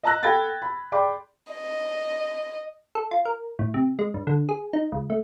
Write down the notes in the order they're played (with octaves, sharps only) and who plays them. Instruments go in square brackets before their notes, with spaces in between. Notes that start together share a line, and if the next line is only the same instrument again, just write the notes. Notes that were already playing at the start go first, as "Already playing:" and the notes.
[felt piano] D#5 A5 A#5 E6 F#6 A#6
A4 F#5 G5 B5 G#6 A6
B5
G#4 D5 G5 B5 C6 D6
[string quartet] D#5
[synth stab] A4
F4
A#4
A2
C3
G#3
G2
D3
G#4
D#4
C#2
A3